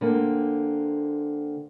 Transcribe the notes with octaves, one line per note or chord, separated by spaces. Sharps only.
D3 A#3 C4